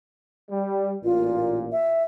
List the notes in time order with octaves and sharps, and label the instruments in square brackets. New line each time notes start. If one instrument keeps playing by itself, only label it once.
[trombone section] G3
[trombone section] A1 A#2 [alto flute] F4
[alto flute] E5